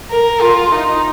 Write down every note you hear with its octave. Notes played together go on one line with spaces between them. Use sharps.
A#4
F4
D#4